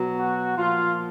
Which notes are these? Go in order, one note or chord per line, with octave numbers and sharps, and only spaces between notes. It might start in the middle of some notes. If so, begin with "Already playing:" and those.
Already playing: B2 F#3
F#4
A#2 F3 F4